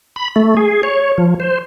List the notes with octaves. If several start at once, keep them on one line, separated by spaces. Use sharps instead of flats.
B5
A3
G#4
C#5
F3
C5